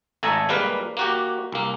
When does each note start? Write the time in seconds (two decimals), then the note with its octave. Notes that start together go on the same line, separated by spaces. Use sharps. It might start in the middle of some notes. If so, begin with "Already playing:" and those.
0.23 G#1 A3 A4 G#5 A#5
0.49 G3 G#3 A#3 B4 F5
0.97 A#3 F#4 G4
1.52 C2 A#3